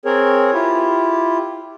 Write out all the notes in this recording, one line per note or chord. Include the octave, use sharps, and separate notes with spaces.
C4 G#4 A#4 C#5
E4 F4 G4